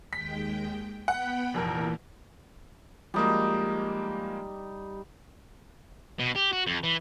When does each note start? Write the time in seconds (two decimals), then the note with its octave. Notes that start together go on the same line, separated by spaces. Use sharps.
0.13 D#2 G#3 G5 B6
1.08 B3 F#5 G5 B5
1.54 F1 F2 A#2 E3 A#4
3.14 F3 G3 G#3 A#3 D#4
6.19 B2
6.36 G4
6.53 F#4
6.67 F2
6.83 E3